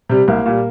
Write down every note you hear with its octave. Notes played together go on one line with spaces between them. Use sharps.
C3 G3
C2 A#3
A#2 G3